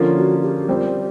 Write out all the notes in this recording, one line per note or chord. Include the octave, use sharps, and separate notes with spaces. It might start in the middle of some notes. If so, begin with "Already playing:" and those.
Already playing: D3 F3 A#3 C#4 F4
F#4
G4
G3 C4 F4